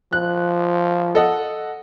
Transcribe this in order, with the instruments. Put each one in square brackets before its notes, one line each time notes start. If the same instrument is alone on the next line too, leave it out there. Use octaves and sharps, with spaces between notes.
[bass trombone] F3 [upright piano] F#6
[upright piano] A4 D#5 F#5